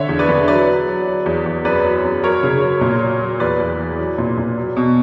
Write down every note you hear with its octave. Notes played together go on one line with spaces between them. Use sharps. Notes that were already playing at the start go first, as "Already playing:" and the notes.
Already playing: D3 C#5 E5
E2
B4 D5
D3
F#3 B4 D5
F#3
F#3
F#3
E2
E2
F#2 B4 D5
F#3
F#2
F#3 A#4 C#5
C#3
F#3
A#2
F#3
F#3
E2 B4 D5
E2
E3
F#3
A#2
A#2
F#3
B2